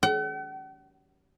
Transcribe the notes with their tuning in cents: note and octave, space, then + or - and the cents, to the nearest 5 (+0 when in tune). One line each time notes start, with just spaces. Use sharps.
F#5 +45